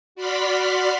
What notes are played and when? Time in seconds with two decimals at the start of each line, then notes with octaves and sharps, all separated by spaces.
0.15 F#4 D5 B5 C6 F6 B6